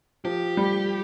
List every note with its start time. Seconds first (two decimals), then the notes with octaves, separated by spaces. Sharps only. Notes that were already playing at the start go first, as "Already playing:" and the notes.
0.25 F3 G4
0.57 G3